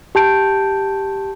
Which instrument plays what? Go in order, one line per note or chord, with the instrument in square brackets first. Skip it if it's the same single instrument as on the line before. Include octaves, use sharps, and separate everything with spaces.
[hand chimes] G4 A5 G6 D7